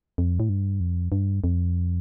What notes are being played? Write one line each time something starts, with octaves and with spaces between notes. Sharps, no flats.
F2
A2
G2
F2
G2
F2